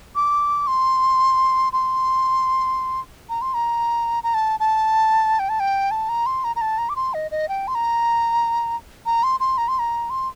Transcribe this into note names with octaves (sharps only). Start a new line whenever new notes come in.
D6
C6
C6
A#5
C6
A#5
A#5
A5
A5
G5
A5
G5
A5
A#5
C6
A#5
A#5
A5
A#5
D6
C6
D#5
D#5
G5
C6
A#5
A#5
C6
C6
A#5
C6
A#5
C6